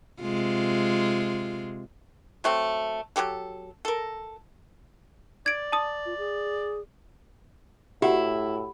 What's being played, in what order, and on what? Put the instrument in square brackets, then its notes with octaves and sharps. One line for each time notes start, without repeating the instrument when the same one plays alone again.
[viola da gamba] C3 G#3 F4
[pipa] F#3 A3 C4
F#3 G3 G4 A4
A4 A#4
[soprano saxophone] D5 [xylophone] G#6 D7
[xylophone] A5 D#6
[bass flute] F4
G#4
[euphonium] A2 [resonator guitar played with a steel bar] E4 [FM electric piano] F#4 [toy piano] G4 F#5